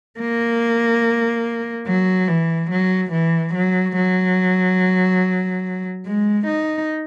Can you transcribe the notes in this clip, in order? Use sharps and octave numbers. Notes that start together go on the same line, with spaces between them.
A#3
F#3
E3
F#3
E3
F#3
F#3
G#3
D#4